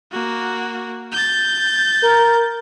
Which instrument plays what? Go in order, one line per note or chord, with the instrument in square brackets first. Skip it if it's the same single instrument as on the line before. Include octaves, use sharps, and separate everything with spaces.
[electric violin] A#3 F#4
G6 A6
[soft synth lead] A#4